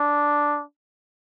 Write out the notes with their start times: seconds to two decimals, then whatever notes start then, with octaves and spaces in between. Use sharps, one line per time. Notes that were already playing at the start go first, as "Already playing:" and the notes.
Already playing: D4